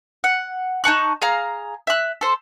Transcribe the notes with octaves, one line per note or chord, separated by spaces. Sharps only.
F#5
D#4 A5 C#6 F#6
G#4 F5 A#5
E5 F#6
A4 C5